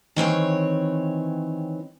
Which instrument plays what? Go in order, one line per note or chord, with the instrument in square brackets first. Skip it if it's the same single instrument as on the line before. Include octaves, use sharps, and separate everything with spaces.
[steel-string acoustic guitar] D#3 E3 C4 C#5